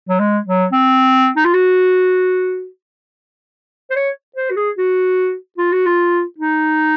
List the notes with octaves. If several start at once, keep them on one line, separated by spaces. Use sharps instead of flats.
F#3
G#3
F#3
C4
D#4
F4
F#4
C5
C#5
C5
F#4
G#4
F#4
F4
F#4
F4
D#4